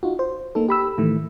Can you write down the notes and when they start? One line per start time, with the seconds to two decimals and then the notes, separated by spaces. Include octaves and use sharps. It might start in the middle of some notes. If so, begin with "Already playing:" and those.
0.03 D#4 F4 F#4
0.19 C5
0.55 A#3 D#4 A4
0.69 G4 B5 E6
0.98 A2 D#3 E3 A3